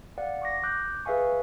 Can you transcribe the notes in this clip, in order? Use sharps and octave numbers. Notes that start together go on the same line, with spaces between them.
D5 F5 F#5
C#6 D6 A#6
D6 F#6 G6
G#4 B4 E5 F5 G#5 C#6